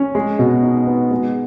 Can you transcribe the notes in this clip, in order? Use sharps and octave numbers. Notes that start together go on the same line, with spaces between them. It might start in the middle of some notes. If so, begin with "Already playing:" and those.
Already playing: C#4
G#3
B2
D#4
B3
G#3